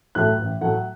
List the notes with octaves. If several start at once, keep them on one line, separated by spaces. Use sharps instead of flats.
A2 F#3 A3 F#6
A1
A2 F#3 A3 F#5